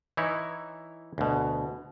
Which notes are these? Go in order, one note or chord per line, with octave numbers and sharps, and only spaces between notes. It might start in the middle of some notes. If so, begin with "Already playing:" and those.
E3 D#4 E4 C#5
D2 B2